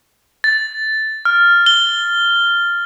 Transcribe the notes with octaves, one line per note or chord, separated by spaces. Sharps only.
A6
F6
G7